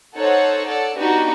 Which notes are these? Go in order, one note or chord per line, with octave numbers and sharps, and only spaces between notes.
D#4 A4 C5 C#5 F#5
A4 C#5 D5 F#5
B3 D4 D#4 F#4 G4